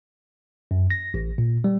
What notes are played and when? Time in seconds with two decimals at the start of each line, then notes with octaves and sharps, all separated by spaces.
0.71 F#2
0.90 A#6
1.14 A1
1.38 A#2
1.64 G3